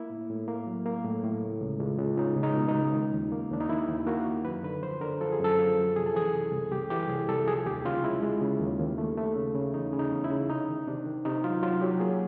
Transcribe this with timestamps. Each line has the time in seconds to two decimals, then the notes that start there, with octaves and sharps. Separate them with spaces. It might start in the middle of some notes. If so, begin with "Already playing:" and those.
Already playing: A#3 E4
0.10 A2
0.30 A2
0.48 A#3
0.66 F#3
0.86 A#3
1.05 A2
1.24 A2
1.42 C#2
1.62 C#2
1.80 C#2
1.99 C#2
2.18 C#2 D#4
2.36 C#2
2.43 D#4
2.56 B2
2.68 D#4
2.75 C#2
2.93 D#3
3.13 D#2
3.32 A#3
3.51 D#2 D4
3.61 D#4
3.69 D#3 E4
3.88 D#2
4.07 A#3 F#4
4.26 D#3
4.45 F#2 B4
4.63 D3 B4
4.83 F3 C5
5.01 D3 A#4
5.21 F3 A4
5.32 G#4
5.40 F#2 A4
5.59 F3
5.77 F#2
5.96 C3 G#4
6.06 A4
6.14 E3 G#4
6.33 C2
6.52 C2
6.71 C2 G4
6.90 E3 G4
7.09 C2 G#4
7.28 C2 A4
7.47 F3 G#4
7.66 D#2 G4
7.85 C#3 F4
8.04 G#3 E4
8.23 G#3
8.41 C#3
8.60 D#2
8.79 D#2
8.98 A3
9.18 A3
9.36 C#3
9.55 C#3
9.74 E2 D#4
9.93 C#3
9.99 D#4
10.12 E2
10.24 E4
10.31 C#3
10.49 C3 D#4
10.69 D#3
10.87 C3 D4
11.06 D#3
11.25 C3 D#4
11.44 F#3 F4
11.62 F#3 F4
11.81 F#3 G4
12.00 A#3 G#4